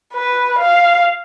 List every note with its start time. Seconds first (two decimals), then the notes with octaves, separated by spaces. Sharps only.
0.13 B4
0.59 F5